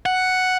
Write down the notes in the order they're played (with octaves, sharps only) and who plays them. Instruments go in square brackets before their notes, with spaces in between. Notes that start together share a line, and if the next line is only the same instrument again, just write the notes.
[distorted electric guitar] F#5